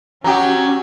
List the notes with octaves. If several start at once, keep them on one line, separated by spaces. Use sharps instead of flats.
F#3 C#4 F#4 G4 A#5